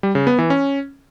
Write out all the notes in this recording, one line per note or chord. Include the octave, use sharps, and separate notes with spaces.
G3
C#3
B3
E3
C#4